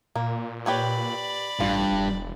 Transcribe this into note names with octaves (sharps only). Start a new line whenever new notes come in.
A#2 A#3
G4 B4 C#5 D5 B5
A1 G2 F4
E1